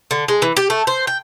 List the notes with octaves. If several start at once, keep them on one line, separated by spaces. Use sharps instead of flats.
D3
G#3
E3
G4
A3
C5
G5